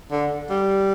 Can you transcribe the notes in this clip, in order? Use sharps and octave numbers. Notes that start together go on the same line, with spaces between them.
D3
G3